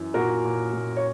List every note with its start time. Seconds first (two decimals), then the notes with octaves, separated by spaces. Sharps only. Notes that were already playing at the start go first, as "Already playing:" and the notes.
Already playing: F#2 E3
0.14 A#2 F#4 A#4
0.45 A#2
0.73 A#2
0.97 C#5